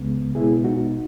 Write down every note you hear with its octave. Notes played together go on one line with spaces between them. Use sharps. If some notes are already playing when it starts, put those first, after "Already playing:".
Already playing: C#2 C#3 G#3 B3
B2 G#3 B3 E4 G#4
D#4 F#4